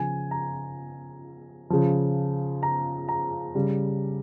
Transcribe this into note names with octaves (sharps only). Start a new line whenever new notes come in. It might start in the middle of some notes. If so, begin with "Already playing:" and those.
Already playing: C#3 F3 G#5
A#5
C#3 F3
A#5
A#5
C#3 G3